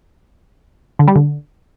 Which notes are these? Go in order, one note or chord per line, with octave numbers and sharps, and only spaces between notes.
D3
G3
D3